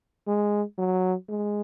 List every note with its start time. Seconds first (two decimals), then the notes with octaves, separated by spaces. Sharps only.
0.27 G#3
0.78 F#3
1.29 G#3